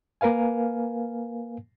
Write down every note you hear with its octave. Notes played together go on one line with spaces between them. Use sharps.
A#3 A#4 B4 F5 G#5